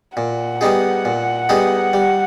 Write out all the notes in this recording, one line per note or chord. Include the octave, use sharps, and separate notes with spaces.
A#2 F#5
G3 B3 D#4 G#4
A#2
G3 B3 D#4 G#4
G3